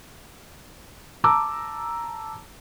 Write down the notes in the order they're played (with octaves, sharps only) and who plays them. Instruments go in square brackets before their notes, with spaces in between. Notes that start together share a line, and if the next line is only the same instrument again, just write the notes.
[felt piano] A5 A#5 D6 E6